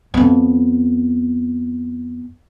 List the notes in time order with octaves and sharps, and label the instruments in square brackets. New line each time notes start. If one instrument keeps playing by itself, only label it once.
[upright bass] F2 B3